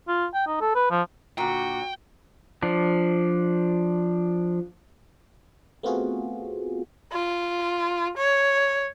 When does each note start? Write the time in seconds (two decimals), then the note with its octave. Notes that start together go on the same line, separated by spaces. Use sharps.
0.08 F4
0.34 G5
0.47 D#4
0.61 A4
0.75 B4
0.91 F3
1.38 A#2 D3 F#4 G5
2.63 F3 D4
5.83 A3 B3 C4 F4 F#4 G#4
7.13 F4
8.17 C#5